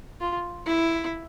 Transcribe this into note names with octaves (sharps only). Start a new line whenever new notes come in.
F4
E4